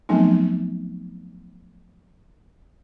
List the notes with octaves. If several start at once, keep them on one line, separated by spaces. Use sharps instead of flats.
F3 F#3 A3 B3 C4 D#4